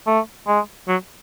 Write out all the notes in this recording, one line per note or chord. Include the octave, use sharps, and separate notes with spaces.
A3
G#3
F#3